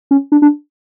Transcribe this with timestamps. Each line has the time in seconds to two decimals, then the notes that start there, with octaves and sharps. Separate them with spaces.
0.11 C#4
0.32 D4
0.42 D4